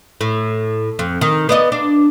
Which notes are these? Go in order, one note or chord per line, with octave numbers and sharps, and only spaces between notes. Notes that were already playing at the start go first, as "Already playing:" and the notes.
A2
F2
D#3
B3 D5 D#5
D4